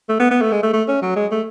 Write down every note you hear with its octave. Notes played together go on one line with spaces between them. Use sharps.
A3
B3
B3
A3
G#3
A3
A3
C#4
F#3
G#3
A3